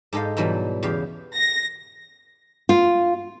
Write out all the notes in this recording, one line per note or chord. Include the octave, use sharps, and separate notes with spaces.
G#2 G4 A4 D#5 F5
G#2 B2 E3 F#3 G3
E2 C#3 G4 F5
A#6
F4